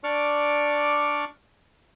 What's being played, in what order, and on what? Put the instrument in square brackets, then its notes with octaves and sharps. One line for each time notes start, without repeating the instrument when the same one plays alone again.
[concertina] D4 D5 C#6 D6 F6